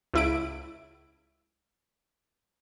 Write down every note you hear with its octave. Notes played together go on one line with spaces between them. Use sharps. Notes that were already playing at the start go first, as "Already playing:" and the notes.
C#2 E4 D7